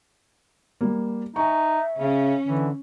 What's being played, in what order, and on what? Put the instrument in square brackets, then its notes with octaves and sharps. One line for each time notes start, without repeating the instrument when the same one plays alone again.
[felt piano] G3 A#3
[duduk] D#4 [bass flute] E5 [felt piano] G#5 A#5 C#6
[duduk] C#3 [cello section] C#4
[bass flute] D3 [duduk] E3